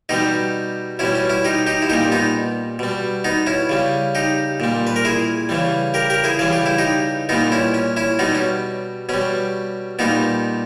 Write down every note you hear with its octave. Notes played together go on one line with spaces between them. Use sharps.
B2 G3 D#4 G4
B2 G3 C#4 E4
C#4
C#4 E4
D#4 G4
D#4 G4
E4
A#2 G3 D#4 G4
B3 D#4
B2 G3
B3 D#4
C#4 E4
C#3 G3
D#4 G4
A#2 G3
B4
A#4
E4 G#4
C#3 E3 G3
G4 A#4
G4 A#4
E4 G#4
C#3 E3 G3 G#4
G4
E4
D#4 G4
A#2 G3 B3 D#4
C#4 E4
C#4
C#4 E4
B2 G3 B3 D#4
C#4
B2 G3 C#4
A#2 G3 B3 D#4